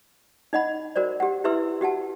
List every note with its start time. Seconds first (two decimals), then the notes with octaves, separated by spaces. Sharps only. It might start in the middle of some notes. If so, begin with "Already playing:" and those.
0.53 D#4 D#5 F#5 B5
0.96 F#4 A#4 C5 D5
1.20 G4 F#5
1.44 E4 G4 B4 E5 C6 E6
1.81 F#4 G4 F#5 A5